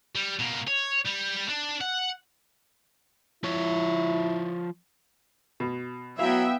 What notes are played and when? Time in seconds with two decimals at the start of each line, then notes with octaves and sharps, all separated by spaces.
0.15 G3
0.39 B2 A#3
0.68 C#5
1.06 G3
1.50 D4
1.81 F#5
3.44 F3 E4 C#5
5.60 B2
6.19 F#3 B3 E4 E5 F5 G5